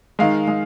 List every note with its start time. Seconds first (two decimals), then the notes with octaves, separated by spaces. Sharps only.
0.19 D#3 G#3 F5
0.48 G#3